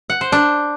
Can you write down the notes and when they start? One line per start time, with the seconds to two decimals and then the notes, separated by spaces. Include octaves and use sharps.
0.10 F#5
0.21 C5
0.32 D4